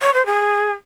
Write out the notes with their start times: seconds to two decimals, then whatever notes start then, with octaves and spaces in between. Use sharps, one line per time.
0.02 C#5
0.14 C5
0.26 G#4